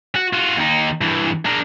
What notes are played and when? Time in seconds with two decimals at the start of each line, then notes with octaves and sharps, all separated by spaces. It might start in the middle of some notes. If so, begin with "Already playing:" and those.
0.16 F#4
0.33 F4 F#4
0.57 D#2 D#4
1.01 G2 E3
1.45 D4 A#4